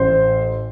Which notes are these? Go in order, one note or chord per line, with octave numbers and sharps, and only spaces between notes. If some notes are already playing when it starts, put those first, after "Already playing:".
Already playing: A1 C5